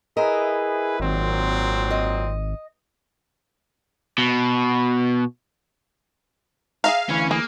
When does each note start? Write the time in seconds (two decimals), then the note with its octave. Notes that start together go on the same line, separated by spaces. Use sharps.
0.17 E4 G#4 A#4 B4 D#5 E5
1.00 G#1 A#2 F#3 C4
1.91 D#5
4.18 B2
6.84 G#4 E5 F5 A#5
7.09 D2 E3 C#4
7.31 A#3 G#4